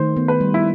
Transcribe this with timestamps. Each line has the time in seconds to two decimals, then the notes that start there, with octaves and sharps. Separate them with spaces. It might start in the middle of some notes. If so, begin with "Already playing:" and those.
Already playing: D#3 A3 C5
0.17 B3
0.28 B4
0.41 G3
0.54 E4